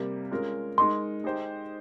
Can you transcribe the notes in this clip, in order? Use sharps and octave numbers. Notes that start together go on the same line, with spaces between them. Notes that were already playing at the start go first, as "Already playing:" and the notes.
Already playing: C3 G3 A#3
G#3 C#4 F4 A#4
G#3 D#4 A#4 C6
G#3 D#4 G4 C5